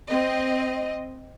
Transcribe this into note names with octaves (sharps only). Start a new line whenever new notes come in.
C4 D#5